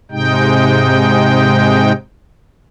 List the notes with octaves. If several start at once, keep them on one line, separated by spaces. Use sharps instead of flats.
G#2 C3 G#3 D#4 G5